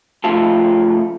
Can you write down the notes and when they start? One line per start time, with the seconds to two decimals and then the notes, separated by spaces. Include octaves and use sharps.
0.24 C#3 F3 A3 F4 A4